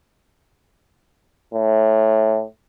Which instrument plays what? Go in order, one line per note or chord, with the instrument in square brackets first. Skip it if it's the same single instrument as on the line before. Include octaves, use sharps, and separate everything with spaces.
[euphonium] A2